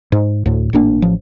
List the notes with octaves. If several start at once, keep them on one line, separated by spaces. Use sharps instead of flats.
G#2
D2 A2
G#1 A2 A#3 D4
A1 F3